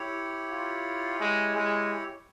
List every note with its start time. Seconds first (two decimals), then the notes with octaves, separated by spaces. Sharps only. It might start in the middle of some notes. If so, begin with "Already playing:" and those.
Already playing: E4 G4 C#5
0.51 F4
1.20 G#3
1.55 G#3